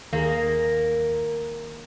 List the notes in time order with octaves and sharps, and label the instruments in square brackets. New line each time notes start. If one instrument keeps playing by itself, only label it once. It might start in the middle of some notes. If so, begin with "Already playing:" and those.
[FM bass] D#2 [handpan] D#3 G#4 [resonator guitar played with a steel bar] A#3 [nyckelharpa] A#4